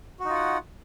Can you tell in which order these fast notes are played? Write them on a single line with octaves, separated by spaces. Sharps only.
F#4 D#4 F4 F#5